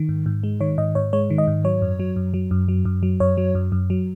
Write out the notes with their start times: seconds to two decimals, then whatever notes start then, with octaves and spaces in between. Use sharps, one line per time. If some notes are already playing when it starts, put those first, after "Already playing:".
Already playing: D#3
0.09 G#2
0.26 G#2
0.43 G#3
0.60 D#3 C#5
0.78 G#2 D#5
0.95 G#2 C#5
1.13 G#3 C#5
1.30 D#3
1.38 D#5
1.47 G#2
1.64 F#3 C#5
1.82 F#2
1.99 F#3
2.16 F#2
2.34 F#3
2.51 F#2
2.68 F#3
2.85 F#2
3.03 F#3
3.20 F#2 C#5
3.37 F#3
3.55 F#2
3.72 F#2
3.90 F#3